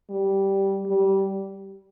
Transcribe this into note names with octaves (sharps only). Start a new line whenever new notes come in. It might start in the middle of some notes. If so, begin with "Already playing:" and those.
G3
G3